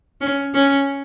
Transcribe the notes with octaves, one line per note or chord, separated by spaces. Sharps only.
C#4
C#4